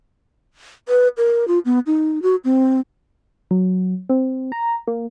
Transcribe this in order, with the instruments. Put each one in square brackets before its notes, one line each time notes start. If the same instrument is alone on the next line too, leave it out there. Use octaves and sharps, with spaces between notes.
[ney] B4
A#4
F4
B3
D#4
F#4
C4
[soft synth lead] F#3
C4
A#5
A#3